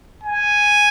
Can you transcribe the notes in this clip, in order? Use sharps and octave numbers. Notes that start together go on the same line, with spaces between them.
G#5